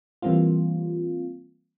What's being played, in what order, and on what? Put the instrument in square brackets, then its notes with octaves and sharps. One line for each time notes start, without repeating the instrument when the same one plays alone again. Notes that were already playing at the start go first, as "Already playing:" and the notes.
[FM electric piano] E3 G3 A#3 C4 F4